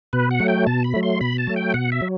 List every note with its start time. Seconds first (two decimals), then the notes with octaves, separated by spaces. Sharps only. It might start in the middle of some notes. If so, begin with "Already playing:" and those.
0.13 B2 B4
0.31 F#5
0.40 F#3 A3
0.48 G5
0.67 B2 A5
0.84 B5
0.94 F#3 A3
1.03 C6
1.21 B2 B5
1.38 A5
1.47 F#3 A3
1.56 G5
1.74 B2 F#5
1.92 E5
2.02 F#3